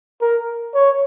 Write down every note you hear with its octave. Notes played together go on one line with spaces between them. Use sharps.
A#4
C#5